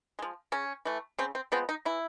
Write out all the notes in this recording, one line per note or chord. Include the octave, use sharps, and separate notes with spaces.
F3 G#3
C#3 C#4
E3 A3
C#3 C4
C4
F3 G#3 B3 C4
D#4
E3 E4